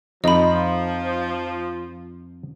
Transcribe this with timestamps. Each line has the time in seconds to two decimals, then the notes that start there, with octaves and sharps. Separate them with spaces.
0.24 F2 F3 D#4 D#5 B5